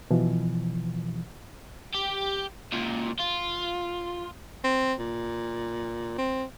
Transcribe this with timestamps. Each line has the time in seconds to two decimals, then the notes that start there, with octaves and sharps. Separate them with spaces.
0.11 B2 E3 F3
1.94 G4
2.72 C#2 A#2
3.20 F4
4.64 C4
4.99 A#2
6.18 C4